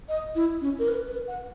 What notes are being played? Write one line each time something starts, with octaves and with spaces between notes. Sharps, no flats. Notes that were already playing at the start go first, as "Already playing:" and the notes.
D#5
E4
C#4
A#4
B4
B4
F#5